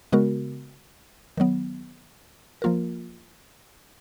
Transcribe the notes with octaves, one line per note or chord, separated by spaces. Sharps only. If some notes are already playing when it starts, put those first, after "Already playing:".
C#3 G#3 B3 F#4 A#4
D#3 F#3 B3
F3 A#3 F4 A#4